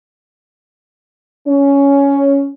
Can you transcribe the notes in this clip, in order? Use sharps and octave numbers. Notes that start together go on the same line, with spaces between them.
C#4